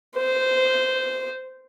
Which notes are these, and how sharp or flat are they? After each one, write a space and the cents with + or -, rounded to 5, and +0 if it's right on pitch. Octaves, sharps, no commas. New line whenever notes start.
C5 -15